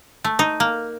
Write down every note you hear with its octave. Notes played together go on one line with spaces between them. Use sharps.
A3
D#4
A#3